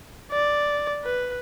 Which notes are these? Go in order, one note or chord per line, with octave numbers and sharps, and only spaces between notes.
D5
B4